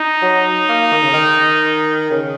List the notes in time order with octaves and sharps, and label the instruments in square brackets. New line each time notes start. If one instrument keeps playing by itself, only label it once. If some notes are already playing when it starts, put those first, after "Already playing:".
Already playing: [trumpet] D#4
[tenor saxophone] F#3
A#3
D#3
C#3
D#3
C#3